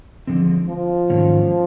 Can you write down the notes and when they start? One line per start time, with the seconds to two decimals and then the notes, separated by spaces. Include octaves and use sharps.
0.27 D3 F3 G#3 C4
0.69 F3
1.10 G#2 D#3 F#3 A#3 C#4